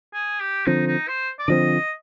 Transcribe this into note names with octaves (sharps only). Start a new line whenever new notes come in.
G#4
G4
D3 F3 C4 D#4
D#4
C5
D5
D3 F3 C4 D#5